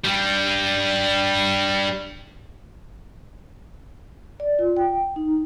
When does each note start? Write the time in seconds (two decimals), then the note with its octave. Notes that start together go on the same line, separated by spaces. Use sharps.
0.05 G2 G3
4.40 D5
4.59 F4
4.77 G5
5.16 D#4